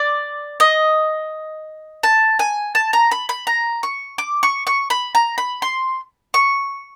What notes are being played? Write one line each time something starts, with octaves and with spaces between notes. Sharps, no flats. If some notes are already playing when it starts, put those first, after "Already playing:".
Already playing: D5
D#5
A5
G#5
A5
A#5
B5
B5
A#5
C#6
D6
C#6
C#6
B5
A#5
B5
C6
C#6